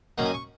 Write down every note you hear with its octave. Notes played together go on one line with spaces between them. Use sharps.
F#2 D#3 A#3 C#4 F#5
G#5
C#6